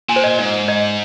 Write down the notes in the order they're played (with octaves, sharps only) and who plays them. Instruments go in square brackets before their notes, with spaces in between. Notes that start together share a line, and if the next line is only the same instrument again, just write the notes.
[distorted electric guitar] A#2 [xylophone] G#5
[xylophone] C5
D#5
[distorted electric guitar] G#2 [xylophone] D#5
[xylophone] D#5